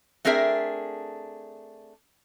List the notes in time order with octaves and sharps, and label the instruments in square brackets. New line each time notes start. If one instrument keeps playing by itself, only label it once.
[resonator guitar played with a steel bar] A3 C4 D4 G#4 A#4 E5